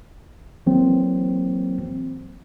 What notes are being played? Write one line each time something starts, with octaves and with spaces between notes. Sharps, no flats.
E3 F#3 A#3 C4